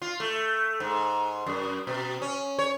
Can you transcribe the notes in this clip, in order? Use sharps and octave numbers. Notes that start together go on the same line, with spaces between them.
F4
A3
G#2
F#2
B2
C#4
C#5